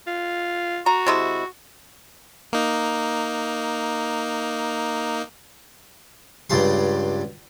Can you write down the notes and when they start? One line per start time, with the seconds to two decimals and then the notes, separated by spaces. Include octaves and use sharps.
0.07 F4
0.86 F#4 A#5
1.06 C3 G#3 E4
2.53 A#3 D#4
6.50 C#2 G2 G3 C6